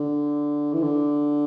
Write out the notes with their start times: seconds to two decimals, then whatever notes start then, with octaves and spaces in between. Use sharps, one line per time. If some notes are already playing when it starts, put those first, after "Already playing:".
Already playing: D3
0.73 E3
0.82 D3